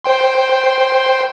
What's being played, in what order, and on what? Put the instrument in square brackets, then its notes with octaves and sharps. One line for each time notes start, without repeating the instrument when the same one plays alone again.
[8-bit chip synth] C5 G5 C6